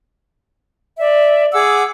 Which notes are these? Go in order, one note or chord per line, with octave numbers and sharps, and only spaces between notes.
D5 E5
G#4 F#5 D6 E6